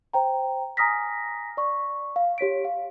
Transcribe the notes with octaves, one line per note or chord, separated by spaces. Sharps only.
C5 G5 A#5
G#5 A#5 D#6 F6 A#6 B6
D5 C#6
F5
G4 C#5 B6 D7
F5